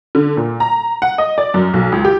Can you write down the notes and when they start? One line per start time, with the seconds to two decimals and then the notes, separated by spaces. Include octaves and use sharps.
0.15 D3
0.37 A#2
0.60 A#5
1.02 F#5
1.18 D#5
1.38 D5
1.54 F#2
1.73 B1
1.92 C#2
2.05 G4